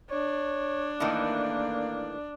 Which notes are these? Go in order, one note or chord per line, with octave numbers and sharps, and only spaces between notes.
D4 C#5
A2 D#3 E3 A#3